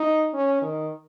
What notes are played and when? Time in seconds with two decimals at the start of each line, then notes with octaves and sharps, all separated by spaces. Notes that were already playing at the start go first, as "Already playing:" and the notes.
Already playing: D#4
0.34 C#4
0.62 D#3